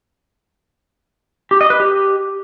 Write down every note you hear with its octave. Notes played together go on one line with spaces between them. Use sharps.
G4
D#5
B4
G4